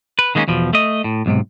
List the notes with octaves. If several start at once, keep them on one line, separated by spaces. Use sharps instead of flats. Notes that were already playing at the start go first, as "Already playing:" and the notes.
B4
D#3 G#3 A#3 C4 C#4 D#4
E2 B2 F3
A3 D#5
A2
B1 G#2 C3